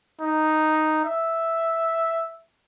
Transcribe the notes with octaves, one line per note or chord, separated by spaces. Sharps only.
D#4
E5